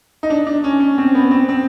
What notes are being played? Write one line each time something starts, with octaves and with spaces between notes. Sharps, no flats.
D#4
D4
D4
C#4
C#4
C4
B3
C4
C4